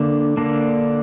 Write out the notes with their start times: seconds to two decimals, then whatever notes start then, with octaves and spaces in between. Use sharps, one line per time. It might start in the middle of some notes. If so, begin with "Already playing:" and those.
Already playing: D3 A#3 D4
0.37 D3 A#3 D4